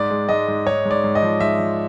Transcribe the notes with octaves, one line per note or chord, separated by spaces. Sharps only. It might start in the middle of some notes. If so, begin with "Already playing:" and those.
Already playing: G#2 D5
G#3
G#2 D#5
G#2
G#2 C#5
G#2
D5
G#2
D#5
F3
G#2 E5
F3